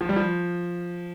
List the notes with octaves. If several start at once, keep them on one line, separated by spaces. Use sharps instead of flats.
F3
G3
F3